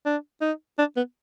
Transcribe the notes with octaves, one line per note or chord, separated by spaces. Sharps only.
D4
D#4
D4
B3